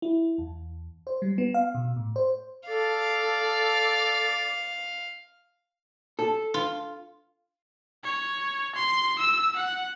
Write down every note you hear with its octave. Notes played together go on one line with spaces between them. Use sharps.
E4
E2
C5
G3
B3
F5
B2
A2
C5
A4 D5 F5
A4
F4
C#5
C6
E6
F#5